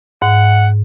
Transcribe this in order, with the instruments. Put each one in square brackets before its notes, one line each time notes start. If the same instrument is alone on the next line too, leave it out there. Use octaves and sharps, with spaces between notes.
[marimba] G#2 [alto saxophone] F#5